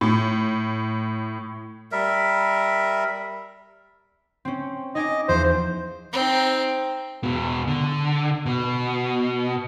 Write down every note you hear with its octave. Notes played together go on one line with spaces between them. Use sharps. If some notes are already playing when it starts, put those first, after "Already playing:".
A2
G3 A#4 E5
C4 C#4
D#4 D#5 G#5 D6
E2 F3 C5
C4 D#4
E2 B2
D3
B2